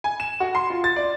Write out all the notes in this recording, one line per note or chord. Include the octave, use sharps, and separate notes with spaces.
G#5
E7
F#4
C6
F4
A6
D5